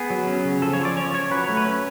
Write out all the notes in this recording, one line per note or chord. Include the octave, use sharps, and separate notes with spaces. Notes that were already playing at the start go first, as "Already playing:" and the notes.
Already playing: B3 G#4
F#3
C#4
C#3
F3 A4
C#5
F3
D5
C#4 C#5
C#4 C#5
F#3 B4
A3 C#5
B4
C#4